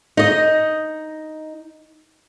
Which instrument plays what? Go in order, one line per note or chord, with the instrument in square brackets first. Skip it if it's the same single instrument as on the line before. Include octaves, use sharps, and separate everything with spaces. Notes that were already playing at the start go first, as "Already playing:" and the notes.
[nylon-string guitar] D#4 D#5